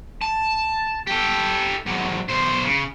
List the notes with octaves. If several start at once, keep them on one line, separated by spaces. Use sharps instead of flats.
A5
G4 A4
G#2 F#3
B1 C5
C#3